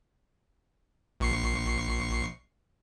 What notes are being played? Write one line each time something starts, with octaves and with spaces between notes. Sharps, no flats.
A#1 C#6 C7